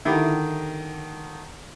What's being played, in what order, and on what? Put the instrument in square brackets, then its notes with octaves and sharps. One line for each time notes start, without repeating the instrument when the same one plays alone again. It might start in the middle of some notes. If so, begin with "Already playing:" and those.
[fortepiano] D3 D#3 [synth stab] E4 G4